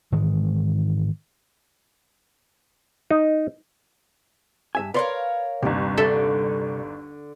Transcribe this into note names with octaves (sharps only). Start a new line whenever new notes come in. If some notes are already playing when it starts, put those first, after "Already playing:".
G#2 D#3 E3 G#3
D#4
G2 E5 G#5
A#4 B4 C#5 D5 F5 C6
G1 D#2 C3 G3
D3 A4 E5